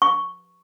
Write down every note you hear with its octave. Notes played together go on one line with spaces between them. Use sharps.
C#6